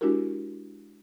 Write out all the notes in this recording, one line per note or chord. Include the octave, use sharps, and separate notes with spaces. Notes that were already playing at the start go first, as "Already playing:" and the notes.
G#3 D4 E4 F#4 G4 A#4